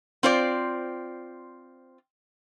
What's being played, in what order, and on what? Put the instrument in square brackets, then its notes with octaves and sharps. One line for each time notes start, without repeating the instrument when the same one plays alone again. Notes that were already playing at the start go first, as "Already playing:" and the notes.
[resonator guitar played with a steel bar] C4 F4 C5 D5